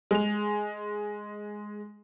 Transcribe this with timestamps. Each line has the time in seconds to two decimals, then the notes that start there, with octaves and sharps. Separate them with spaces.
0.11 G#3 F7